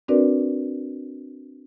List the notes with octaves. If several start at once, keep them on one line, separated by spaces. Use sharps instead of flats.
C4 D4 F#4 A#4 B4 D5